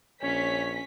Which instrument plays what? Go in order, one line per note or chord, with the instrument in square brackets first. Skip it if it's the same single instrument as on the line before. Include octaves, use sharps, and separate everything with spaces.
[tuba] A#1 [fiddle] C#4 [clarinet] C#5 [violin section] B6